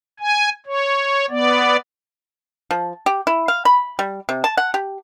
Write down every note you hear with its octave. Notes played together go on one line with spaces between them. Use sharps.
G#5
C#5
B3 D5
F3
G4
E4
F5
B5
G3
C3
A5
F#5
G4